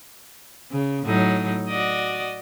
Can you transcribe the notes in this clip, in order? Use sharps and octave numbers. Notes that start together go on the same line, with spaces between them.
C#3
A2 F#3 D#4
F#4 D5 D#5